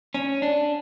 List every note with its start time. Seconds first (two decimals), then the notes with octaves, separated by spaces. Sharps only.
0.14 C#4
0.42 D4